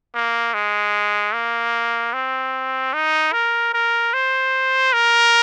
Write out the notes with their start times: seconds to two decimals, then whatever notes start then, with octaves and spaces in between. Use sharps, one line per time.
0.14 A#3
0.53 G#3
1.33 A#3
2.13 C4
2.93 D#4
3.33 A#4
3.74 A#4
4.13 C5
4.93 A#4